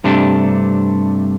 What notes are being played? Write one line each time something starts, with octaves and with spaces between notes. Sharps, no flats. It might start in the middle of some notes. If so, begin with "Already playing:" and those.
G2 C3 A3 D4